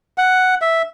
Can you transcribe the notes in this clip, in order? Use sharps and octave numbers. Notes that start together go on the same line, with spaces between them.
F#5
E5